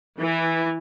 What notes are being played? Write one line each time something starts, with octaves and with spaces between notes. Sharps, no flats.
E3